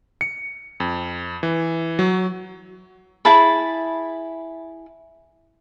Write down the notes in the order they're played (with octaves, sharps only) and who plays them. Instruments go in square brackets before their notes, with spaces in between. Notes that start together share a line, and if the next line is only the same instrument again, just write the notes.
[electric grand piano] C#7
F2
E3
F#3
[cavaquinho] E4 G#4 A5 B5